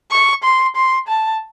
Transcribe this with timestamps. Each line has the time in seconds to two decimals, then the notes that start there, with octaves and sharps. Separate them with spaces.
0.11 C#6
0.44 C6
0.76 C6
1.08 A5